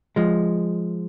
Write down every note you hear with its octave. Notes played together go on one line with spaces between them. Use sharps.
F3 G#3